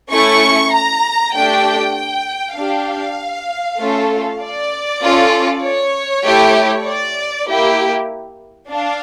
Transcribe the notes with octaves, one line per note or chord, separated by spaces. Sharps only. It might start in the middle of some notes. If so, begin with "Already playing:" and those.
A3 C#4 E4 C#6
A#5
A3 D4 G4 G5
G5
D4 G4 F5
A3 C#4 F4 A4
D5
C#4 F4 A4
C#5
A3 E4 G4
D5
A#3 E4 G4
D4 F5